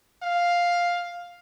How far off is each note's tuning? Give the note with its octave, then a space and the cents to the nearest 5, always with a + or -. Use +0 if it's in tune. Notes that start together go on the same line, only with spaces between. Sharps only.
F5 +5